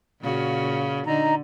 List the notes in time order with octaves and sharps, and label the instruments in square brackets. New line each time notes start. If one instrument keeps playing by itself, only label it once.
[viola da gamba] A#2 C#3 F#4
[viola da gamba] D3 [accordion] D#4 A#5